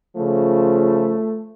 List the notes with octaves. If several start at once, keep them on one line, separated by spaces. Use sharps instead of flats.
C#3 F3 A3 F4